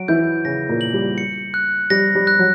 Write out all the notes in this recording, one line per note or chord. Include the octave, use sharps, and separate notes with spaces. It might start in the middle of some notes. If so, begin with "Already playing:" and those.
Already playing: F#3 F#4 D7
E3 E4 G6
C#3 C#4 A#6
A#2 A#3
F#7
G3
C#7
F#6
G3 A#6
G3
F#6
F#3